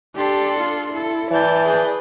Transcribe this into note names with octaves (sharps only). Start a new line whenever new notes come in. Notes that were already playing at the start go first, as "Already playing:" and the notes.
D4 G4 A4 C6
F4
E4 A4
E3 D5 A5 G6
G#4 B4